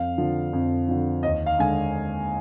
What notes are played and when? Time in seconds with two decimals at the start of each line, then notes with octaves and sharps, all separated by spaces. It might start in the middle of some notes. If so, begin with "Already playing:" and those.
Already playing: F2 F5
0.18 D3 F3
0.53 F2
0.88 D3 F3
1.23 D#2 D#5
1.46 F5
1.58 D3 G#3 G#5